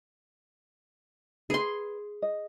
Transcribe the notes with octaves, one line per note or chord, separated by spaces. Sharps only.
G#4 B4 C6
D#5